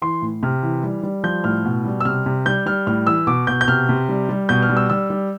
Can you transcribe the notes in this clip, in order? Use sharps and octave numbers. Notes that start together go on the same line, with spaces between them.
E3 C6
A2
C3 F6
E3
G3
G3
F3 G6
A2 F6
B2
G3
E6
C3 F6
C3
G3 G6
G3 F6
A2 F6
E3 E6
B2 D6
B2 G6
G6
C3 F6
C3
G3
G3
B2 G6
F6
G3
E6
G3 E6
G3